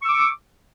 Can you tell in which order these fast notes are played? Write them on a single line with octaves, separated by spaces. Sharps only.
C#6 E6 D6